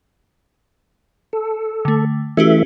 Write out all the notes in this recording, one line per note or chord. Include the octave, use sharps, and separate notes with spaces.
A4
D3 A3
E3 A3 C#4 F#4 G4 E5